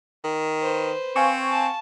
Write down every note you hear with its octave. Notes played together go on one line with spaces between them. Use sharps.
D#3
B4 C5
C4 F5 G#5 C#6
A5